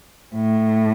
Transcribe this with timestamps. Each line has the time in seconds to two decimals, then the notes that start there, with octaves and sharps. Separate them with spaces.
0.35 A2